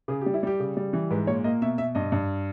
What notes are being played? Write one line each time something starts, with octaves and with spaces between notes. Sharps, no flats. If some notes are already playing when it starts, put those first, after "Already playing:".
C#3 G#4
G3 G4
E4
G3 G4
C#3
G3
E3
G#2 B4
A#2 C#5
A#3 D#5
B2 E5
B2 E5
G2 D#5
G2